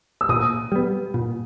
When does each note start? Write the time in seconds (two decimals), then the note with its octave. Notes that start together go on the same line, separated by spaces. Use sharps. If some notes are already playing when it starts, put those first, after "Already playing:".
0.21 E6
0.29 A#2 D#6
0.72 G3 B3
1.14 A#2